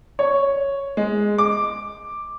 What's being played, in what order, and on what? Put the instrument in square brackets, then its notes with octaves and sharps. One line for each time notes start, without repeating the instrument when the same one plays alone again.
[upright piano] C#5
G#3
D6